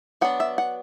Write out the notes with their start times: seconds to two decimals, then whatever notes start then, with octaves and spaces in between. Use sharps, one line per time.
0.21 F#3 B3 D4 F#5
0.40 E5
0.58 F#5